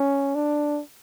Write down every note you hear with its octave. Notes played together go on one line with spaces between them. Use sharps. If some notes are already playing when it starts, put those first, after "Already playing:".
Already playing: C#4
D4